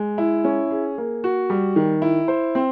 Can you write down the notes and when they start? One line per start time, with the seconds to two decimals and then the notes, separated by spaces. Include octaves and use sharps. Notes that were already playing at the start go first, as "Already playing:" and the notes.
Already playing: G#3
0.18 E4
0.44 C#4
0.71 G#4
0.98 A#3
1.24 F#4
1.50 G3
1.76 D#3
2.02 E4
2.28 C5
2.55 C4